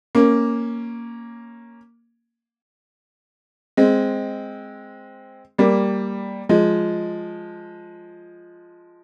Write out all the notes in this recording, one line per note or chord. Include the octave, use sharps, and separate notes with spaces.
A#3 C#4
G#3 C4
G3 A#3
F3 G#3